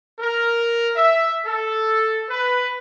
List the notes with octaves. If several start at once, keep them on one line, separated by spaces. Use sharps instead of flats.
A#4
E5
A4
B4